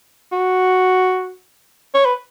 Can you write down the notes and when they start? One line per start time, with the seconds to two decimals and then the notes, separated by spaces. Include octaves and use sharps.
0.32 F#4
1.94 C#5
2.05 B4